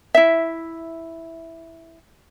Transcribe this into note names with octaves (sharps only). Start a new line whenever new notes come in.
E4 E5